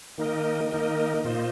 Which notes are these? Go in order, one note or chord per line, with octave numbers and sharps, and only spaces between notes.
D#3 A#3 D#4 A#4 D#5
D#3 A#3 D#4 A#4 D#5
A#2 A#3 F4 C5 D#5